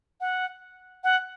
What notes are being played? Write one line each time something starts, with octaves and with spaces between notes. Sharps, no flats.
F#5
F#5